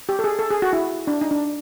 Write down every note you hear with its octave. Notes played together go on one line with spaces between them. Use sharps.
G4
A4
G#4
A4
G#4
F#4
E4
D4
D#4
D4